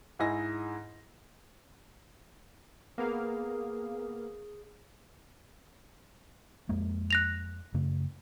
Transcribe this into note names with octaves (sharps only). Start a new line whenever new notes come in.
G#2 E4 G#4 D#5 G#5 A#6
A#3 B3 G#4 F5
F2 G#3 A#3
F#6 A#6 F7
F#2 C#3 A3